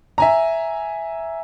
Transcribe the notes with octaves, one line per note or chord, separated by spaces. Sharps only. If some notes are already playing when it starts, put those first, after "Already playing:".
E5 G#5 A#5